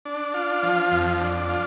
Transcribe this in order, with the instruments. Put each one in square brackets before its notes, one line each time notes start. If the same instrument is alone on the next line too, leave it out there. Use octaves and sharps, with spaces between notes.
[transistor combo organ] D4
F4
F3
F2
D4
F4